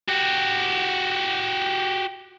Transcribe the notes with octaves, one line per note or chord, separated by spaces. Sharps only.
F#4 G4